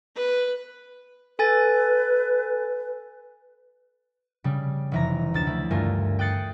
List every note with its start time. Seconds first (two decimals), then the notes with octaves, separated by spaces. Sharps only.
0.16 B4
1.39 A4 B4 G#5 A6
4.44 C#3 G3
4.92 F1 E3 A#5
5.34 D2 A6 E7
5.47 A3 E4
5.70 G2 G3 A3 F4 A#4 G#5
6.19 G5 D#6 F#6 A6 C7 C#7